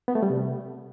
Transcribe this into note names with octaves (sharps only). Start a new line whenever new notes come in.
B3
A3
G3
C3